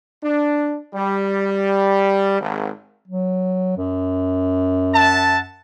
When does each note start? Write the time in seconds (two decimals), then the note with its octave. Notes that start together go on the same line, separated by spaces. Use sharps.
0.23 D4
0.94 G3
2.41 G#1
3.08 F#3
3.77 F#2
4.94 E5 F#5 A5